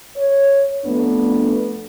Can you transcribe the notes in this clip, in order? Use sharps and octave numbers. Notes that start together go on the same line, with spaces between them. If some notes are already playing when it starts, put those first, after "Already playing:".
C#5
F2 A3 B3 D4